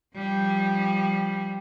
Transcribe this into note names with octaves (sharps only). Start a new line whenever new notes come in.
F3 G3